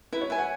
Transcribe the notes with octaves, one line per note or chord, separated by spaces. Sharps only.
E4 B4
C#5
B4 E5 G#5
F#5